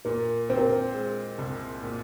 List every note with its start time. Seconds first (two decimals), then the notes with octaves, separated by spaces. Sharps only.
0.05 A#2 A#4
0.49 C4 C5
0.57 A#4
0.66 C5
0.94 G#3
1.38 C2
1.83 A#2